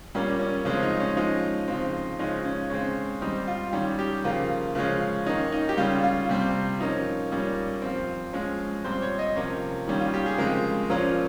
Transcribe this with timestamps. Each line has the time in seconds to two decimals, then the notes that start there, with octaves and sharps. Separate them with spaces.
0.15 A#2 G3 A#3 C#4
0.40 C#4
0.65 C#3 F3 G#3 C4 C#4
0.83 D#4
1.00 C#4
1.17 F3 G#3 C#4 D#4
1.68 C#3 F3 C4
2.19 C#3 F3 G#3 C#4 D#4
2.45 C#4
2.70 C#3 G#3 C4 C#4
3.22 D#3 G3 C4 D#4
3.47 F4
3.73 D#3 G3 C#4
3.99 G4
4.24 C#3 F3 A#3 F4
4.75 C#3 F3 G#3 C#4
5.26 D#3 A#3 C#4 D#4
5.52 D#4
5.69 G4
5.77 C#3 G3 C#4 F4
6.03 F4
6.29 C3 G3 C4
6.80 F3 A#3 C#4 D#4
7.31 A#2 G3 A#3 C#4
7.82 F3 C4
8.33 F3 G#3 C#4
8.84 A#2 G3 C4 C5
9.02 C#5
9.19 D#5
9.36 C3 F3 A#3 C#4 C#5
9.88 D#3 G3 C#4
10.00 F4
10.14 G4
10.26 G#4
10.38 C#3 F3 G#3 C4 A#4
10.90 A#2 F3 A#3 C#4